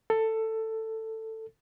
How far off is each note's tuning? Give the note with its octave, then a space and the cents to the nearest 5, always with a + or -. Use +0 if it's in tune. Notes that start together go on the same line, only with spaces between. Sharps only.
A4 +10